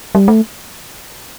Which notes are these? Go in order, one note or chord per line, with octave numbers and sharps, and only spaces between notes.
G3
A3